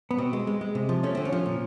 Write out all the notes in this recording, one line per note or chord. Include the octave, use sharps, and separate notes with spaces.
B3
B2 C4
G#3
G#3
G#3
C3
F3
A3 C#4
D3 C4
C#4
F3
A#2